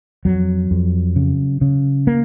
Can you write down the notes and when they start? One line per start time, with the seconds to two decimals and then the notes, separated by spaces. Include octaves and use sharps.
0.25 F2 F#3
0.71 F2
1.16 C#3
1.61 C#3
2.07 A#3